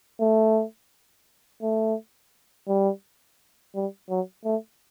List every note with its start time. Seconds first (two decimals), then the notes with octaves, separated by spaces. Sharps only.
0.21 A3
1.62 A3
2.68 G3
3.75 G3
4.10 F#3
4.45 A3